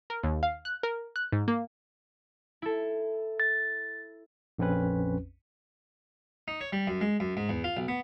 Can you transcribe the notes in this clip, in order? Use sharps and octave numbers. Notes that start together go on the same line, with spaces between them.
A#4
D#2
F5
F#6
A#4
F#6
G#2
A#3
E4 A4
A6
A#1 F2 C4 C#4 B4
D#4
C#5
G3
F#2
G#3
F#2
G#2
E2
F4
B1
B3